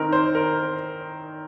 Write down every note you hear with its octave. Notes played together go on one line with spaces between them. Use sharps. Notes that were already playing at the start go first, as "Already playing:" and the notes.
Already playing: D#3 C4 D#4 A#4
C5
A#4